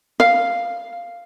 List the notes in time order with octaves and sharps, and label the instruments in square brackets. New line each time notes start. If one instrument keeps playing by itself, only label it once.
[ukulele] F5